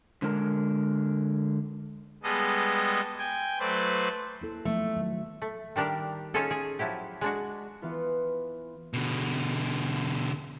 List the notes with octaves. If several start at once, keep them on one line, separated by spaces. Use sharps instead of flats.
D3 G#3 A#4
G3 G#3 B3 G#4 A4 D#5
G5 G#5
F#3 A3 B4 C5 D5
A#3 E4 A4
F3 F#3 A3 B3
D#3 F#3
A3
D#3 G3 D4 G4 A#4
C#4 D#4 F4 G#4 A4
G#4
F3 F#3 E4 G4
G#3 D4 F#4
E3 B3 F4
B2 D3